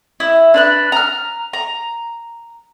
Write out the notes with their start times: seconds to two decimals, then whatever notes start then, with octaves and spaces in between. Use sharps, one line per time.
0.20 E4
0.54 D4 B4 F#6
0.92 A#5 F6
1.53 A#5